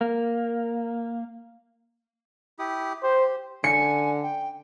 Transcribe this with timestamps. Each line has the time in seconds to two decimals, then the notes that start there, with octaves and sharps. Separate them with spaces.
0.01 A#3
2.59 E4 G4 D#6
3.03 G4 C5
3.64 D3 G#5 C#7
4.23 G5